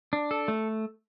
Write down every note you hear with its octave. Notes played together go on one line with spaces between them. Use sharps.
D4
A4
A3